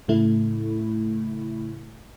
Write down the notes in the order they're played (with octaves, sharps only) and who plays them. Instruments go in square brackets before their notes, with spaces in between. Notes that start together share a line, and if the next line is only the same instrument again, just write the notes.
[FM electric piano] A2 C#3 A3 E4